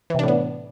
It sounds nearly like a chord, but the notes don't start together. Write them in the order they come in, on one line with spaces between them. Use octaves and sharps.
E3 C3 D4 A2 B3